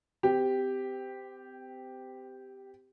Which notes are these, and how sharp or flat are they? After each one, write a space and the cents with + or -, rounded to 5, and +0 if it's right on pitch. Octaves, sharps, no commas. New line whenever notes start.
C4 -30 G4 +0